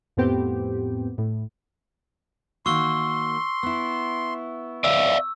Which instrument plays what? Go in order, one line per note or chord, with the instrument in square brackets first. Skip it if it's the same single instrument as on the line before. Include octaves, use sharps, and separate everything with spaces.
[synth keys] F2 A2 B3 C4 G4
A2
[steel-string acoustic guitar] D#3 A#3 F#4 [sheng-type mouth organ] C6 [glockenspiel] C#6 E6 G7
[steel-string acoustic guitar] B3 E4
[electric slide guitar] D5 E5 F5 [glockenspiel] E6